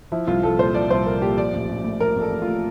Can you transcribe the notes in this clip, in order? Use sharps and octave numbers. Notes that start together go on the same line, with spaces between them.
F3 E4
C2 F4
C2 A4
A#2 C5
F3 D5
C2 C5
C2 A#4
A#2 G4
F3 D5
A1
A1
A2
F3 A#4
A1 A4
A1
F4
A2